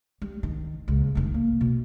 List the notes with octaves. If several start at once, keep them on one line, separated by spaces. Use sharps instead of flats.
G3
D#3
D#1 C#2
F1 D#3
A#3
B2